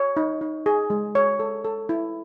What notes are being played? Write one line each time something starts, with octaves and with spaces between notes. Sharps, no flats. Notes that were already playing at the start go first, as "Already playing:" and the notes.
Already playing: C#5
D#4
D#4
G#4
G#3
C#5
A4
A4
E4